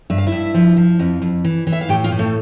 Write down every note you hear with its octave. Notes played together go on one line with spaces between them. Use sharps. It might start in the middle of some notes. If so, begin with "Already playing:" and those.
G2 E5
F5
E4 E5
G2
F3
F3
F2
F2
E3
E3
E5
F5
A2 G4 G5
F4 F5
A2
A3 A4